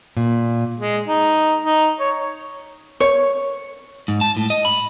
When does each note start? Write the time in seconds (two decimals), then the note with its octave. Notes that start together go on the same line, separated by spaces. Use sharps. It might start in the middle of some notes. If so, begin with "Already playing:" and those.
0.17 A#2
0.79 G#3
1.08 D#4
1.63 D#4
2.00 C#5
3.00 C#5
4.08 G#2
4.21 A5
4.37 A2
4.50 D#5
4.65 B5